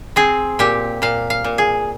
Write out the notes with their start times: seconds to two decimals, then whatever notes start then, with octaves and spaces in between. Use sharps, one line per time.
0.16 C4 G#4
0.59 A#2 G4
1.02 A#2 F5
1.30 F5
1.44 A#2
1.58 G#4